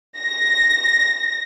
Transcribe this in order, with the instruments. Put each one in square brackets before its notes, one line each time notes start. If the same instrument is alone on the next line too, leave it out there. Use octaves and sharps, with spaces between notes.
[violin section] A#6